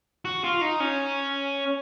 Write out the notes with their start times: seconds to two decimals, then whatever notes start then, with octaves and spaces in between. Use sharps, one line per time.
0.25 F#4
0.44 F4
0.61 D#4
0.80 C#4